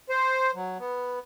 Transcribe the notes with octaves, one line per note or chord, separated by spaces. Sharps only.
C5
F#3
B3